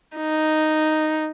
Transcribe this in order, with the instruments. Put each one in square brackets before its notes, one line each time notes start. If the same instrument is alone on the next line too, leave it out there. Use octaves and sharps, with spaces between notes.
[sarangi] D#4